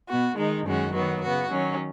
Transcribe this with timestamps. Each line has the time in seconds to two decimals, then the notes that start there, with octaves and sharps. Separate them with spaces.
0.08 B2 B3 F#4
0.37 D#3 G#3 D#4
0.66 F#2 D#3 G#3 C#4 F#4
0.94 D#3 F#3 B3 F#4
1.23 C#3 B3 F#4
1.51 D#3 F#3 C#4